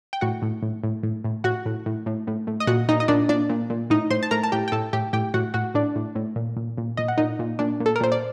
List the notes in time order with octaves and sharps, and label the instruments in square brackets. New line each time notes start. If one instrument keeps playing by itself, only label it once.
[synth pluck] G5
A2 F#4 F#5
A2
A2
A2
A2
A2
A2 F#4 F#5
A2
A2
A2
A2
A2
D#5
A#2 F#4 F#5
A#2 D#4 D#5
D#5
A#2 D4 D5
A#2 D4 D5
A#2
A#2
A2 D#4 D#5
A2 C5 C6
A5
A2 A#4 A#5
A5
A2 G4 G5
G5
A2 A4 A5
A2 G4 G5
A2 G4 G5
A2 F#4 F#5
A2 F#4 F#5
A2 D4 D5
A2
A2
A#2
A#2
A#2
A#2 D#5
F#5
A#2 D#4 D#5
A#2
A#2 D4 D5
A#2
A4
A#4
A#2 C5
D5